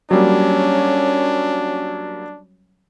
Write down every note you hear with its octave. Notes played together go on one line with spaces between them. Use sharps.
F#3 G3 A#3 C#4 D4